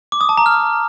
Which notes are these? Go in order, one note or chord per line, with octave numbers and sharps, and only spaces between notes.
D6
D#6
A5
A#5
F6